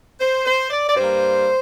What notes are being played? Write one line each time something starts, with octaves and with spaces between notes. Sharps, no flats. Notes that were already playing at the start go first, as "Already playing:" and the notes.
C5
C5
D5
D5
G2 G3 A#3 C5